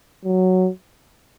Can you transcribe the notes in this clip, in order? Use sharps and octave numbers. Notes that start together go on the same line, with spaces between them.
F#3